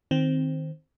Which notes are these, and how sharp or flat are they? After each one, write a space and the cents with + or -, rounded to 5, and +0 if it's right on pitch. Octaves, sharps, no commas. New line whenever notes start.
D#3 +0 C4 +0